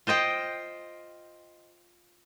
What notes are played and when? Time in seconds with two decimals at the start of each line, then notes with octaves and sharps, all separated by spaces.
0.07 F4 C5 D#5 G5